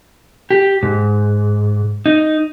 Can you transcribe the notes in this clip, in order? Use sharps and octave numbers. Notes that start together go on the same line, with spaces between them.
G4
G#2
D#4